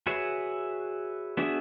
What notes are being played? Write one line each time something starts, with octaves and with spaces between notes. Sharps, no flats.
F#4 G#4 B4 C#5 E5
B3 D4 F#4 G#4 E5